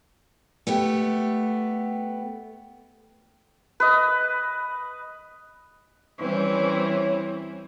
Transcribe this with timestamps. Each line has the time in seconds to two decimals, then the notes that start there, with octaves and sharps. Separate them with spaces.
0.67 A3 B3 G4
3.80 B4 D#5
6.20 E3 G3 C4 C#4 E4